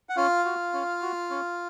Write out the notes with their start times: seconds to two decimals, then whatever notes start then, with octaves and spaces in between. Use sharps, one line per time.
0.09 F#5
0.17 C#4 F4 F5
0.45 F#4
0.73 C#4
1.02 F#4
1.30 C#4